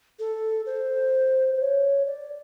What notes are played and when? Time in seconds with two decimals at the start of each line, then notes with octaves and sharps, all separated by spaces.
0.19 A4
0.66 C5
1.55 C5
1.60 C#5
2.07 D5